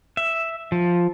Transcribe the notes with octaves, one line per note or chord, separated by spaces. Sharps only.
E5
F3